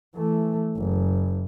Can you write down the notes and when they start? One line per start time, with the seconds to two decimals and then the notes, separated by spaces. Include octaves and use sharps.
0.15 E3 A3
0.77 F#1